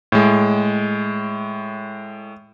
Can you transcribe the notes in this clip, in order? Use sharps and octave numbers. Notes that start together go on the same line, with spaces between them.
A2 G#3